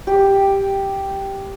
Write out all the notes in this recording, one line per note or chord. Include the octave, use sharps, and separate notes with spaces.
G4